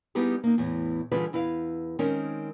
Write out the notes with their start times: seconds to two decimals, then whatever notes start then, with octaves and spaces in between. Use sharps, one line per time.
0.15 G3 B3 D#4 E4 G4 G#4
0.44 A#3 D#4
0.58 E2 A2 E3
1.11 D3 E3 G3 F4 G#4 B4
1.33 E2 E4 B4 F5
1.99 D#3 G#3 C4 C#4 D#4 A#4